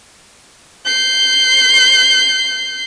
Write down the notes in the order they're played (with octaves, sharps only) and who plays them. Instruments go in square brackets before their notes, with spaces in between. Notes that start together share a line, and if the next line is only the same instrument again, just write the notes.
[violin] G6 C7